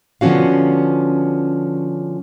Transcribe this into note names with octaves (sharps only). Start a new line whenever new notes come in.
D3 F3 B3 C#4 F#4 F5